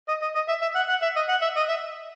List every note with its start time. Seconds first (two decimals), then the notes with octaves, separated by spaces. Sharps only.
0.08 D#5
0.22 D#5
0.35 D#5
0.48 E5
0.62 E5
0.75 F#5
0.89 F#5
1.02 E5
1.16 D#5
1.29 F#5
1.42 E5
1.56 D#5
1.69 E5